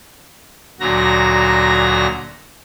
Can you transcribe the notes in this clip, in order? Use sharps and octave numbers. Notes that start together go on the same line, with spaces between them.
D2 A#2 F#3 F#4 A#5 A#6